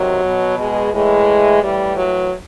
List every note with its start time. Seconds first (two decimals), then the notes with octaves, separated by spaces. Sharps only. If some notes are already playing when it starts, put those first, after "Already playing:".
Already playing: C3 D#3 F#3
0.25 B2
0.59 G#3
0.94 A2 E3 G#3
1.62 A2 E3 G3
1.97 F#3